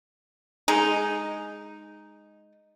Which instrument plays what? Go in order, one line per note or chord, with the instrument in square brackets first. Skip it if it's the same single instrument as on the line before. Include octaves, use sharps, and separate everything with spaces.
[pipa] G#3 D#4